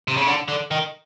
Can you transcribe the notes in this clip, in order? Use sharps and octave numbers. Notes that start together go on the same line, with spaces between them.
C3
C#3
D3
D3
D#3